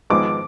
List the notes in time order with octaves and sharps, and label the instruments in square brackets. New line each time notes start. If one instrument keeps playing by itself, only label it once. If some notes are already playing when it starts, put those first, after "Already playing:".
[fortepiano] G#1 G#2 F3 G#3 B3 [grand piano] D6